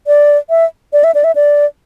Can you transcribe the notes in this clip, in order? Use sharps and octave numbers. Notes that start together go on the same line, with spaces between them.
D5
E5
D5
E5
D5
E5
D5